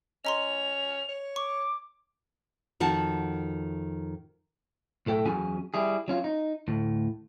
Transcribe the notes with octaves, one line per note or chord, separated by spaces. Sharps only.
C#4 D#5 A#5 C6 F7
C#5
C#6 D6
F2 D#3 F#4 A5
B1 A2 A4 G5
E2 F#3 C#4 F#4 G#4 G#5
G3 E4 G#4
F#3 C#4 F4
D#4
D2 A2